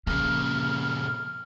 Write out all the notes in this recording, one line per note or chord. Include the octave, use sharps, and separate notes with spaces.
A#2 C#3 F3 A#3 F6